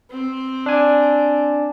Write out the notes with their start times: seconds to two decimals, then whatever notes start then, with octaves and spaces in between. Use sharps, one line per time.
0.11 C4
0.66 D4 G#5